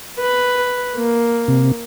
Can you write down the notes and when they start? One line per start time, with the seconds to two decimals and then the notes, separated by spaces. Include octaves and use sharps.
0.20 B4
0.96 A#3
1.48 C3